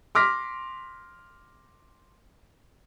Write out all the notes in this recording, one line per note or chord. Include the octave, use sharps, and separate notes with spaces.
C6 D6 F6 A#6 B6